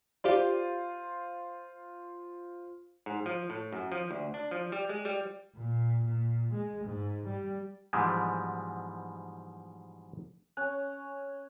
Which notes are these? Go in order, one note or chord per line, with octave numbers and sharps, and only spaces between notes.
F4 G4 C5 D5
G#2
F3
A2
F#2
F3
D2
D4
F3
G3
G#3
G3
A#2
A#2
G#3
G#2
G3
G#2 B2 E3 F3 G3 G#3
C#4 F#6